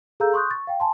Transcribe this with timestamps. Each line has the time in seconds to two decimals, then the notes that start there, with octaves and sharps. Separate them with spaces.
0.20 G#4 A4 F5 A#5 E6 G6
0.33 C6 C#6 D#6 F#6 G6
0.51 C#6 A6
0.67 F5 G5
0.80 G#5 A5 C6